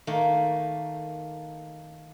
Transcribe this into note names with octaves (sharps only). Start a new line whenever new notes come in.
D#3 A3 A#3